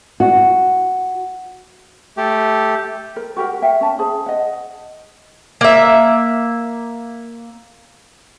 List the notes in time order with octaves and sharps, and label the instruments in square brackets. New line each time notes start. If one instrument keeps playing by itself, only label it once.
[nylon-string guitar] F#4
[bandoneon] A3 G4
[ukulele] A#4
F#4 G4 A#4 F#5
E5 G5
C#4 A5
G#4 C5 A5
D#5 F#5
[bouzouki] A#3 E5